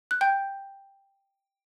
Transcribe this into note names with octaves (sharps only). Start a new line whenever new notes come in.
F#6
G5 G6